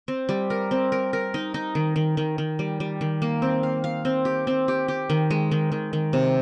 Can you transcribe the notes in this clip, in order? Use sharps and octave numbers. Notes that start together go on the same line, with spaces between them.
C4
G3
A#4
C4
A#4
A#4
D#4
D#4
D#3
D#3
D#3
D#3
G3
G3
D#3
A#3
C4
F5
F5
C4
G4
C4
G4
G4
D#3
G#3
D#3
D#3
D#3
C3